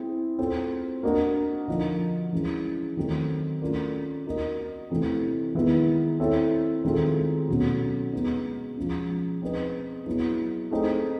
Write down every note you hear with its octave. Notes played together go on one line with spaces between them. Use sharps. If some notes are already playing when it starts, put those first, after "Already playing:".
Already playing: C4 E4 G#4
C4 F4 A4 C5
A#3 D4 F#4 A#4 D#5
D3 F3 A#3 D#4
E3 G#3 C#4
D#3 F#3 A3 C4 D#4
A3 C#4 F4 A#4 D5
A#3 D#4 F#4 A#4 D#5
C3 E3 A3 C4
D#3 G#3 B3 E4
C4 E4 A4 C#5 E5
D#3 G#3 C4 F4 A4
B2 F#3 A3 C#4 F#4
G#3 B3 D#4
F3 G#3 C#4
C4 D#4 G#4 B4 D#5
F#3 B3 E4 G#4
A3 C4 D#4 G#4 C5